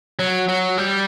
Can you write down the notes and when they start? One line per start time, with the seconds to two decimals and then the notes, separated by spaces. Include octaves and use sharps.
0.19 F#3
0.49 F#3
0.78 G3